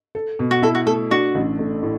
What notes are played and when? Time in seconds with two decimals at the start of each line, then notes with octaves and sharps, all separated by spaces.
0.15 A4
0.39 B2
0.51 F#4
0.62 E4 A4
0.75 F#4
0.86 A3 A4
1.11 D4 F#4
1.35 A1
1.59 A3
1.83 A2